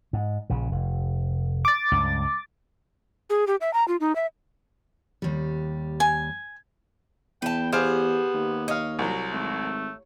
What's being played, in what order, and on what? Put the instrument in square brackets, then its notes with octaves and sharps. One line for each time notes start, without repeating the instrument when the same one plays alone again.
[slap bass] G#2
A#1 C#3
F1
[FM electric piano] D6 A6
[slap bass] C#2 G2
[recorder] G#4
G4
E5
A#5
F4
D#4
E5
[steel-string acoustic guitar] D#2 G3
[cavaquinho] G#5
[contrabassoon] E2 [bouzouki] B4 A5 [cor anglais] G5
[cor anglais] B3 [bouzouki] G4 [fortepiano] G#4 C5 F5
[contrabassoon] D#2
[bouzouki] C#5 [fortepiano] D#5 F5
[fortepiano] C2 F#3
[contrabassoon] G#1 [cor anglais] A3